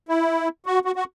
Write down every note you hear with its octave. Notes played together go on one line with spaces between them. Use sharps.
E4
F#4
F#4
F#4